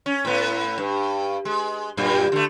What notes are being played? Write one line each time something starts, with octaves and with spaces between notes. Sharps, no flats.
C#4
A2 B3
G2
G#3
F#2 A#2 G3
D3 A3